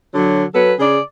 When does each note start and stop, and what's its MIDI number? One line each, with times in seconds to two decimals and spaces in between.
0.14 0.44 50
0.14 0.44 54
0.55 0.73 54
0.55 0.73 69
0.55 0.73 71
0.79 0.99 49
0.79 0.99 68
0.79 0.99 74